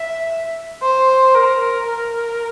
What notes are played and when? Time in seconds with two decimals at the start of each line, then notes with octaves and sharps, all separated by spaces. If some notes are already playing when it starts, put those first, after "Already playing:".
Already playing: E5
0.83 C5
1.35 A#4
1.86 A#4